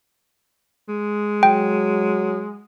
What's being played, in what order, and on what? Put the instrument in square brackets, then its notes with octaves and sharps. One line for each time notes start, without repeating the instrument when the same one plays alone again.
[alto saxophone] G#3
[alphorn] F#3 [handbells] G5